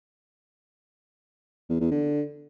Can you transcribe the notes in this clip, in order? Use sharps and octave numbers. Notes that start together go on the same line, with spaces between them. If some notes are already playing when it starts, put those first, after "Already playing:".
E2
E2
D3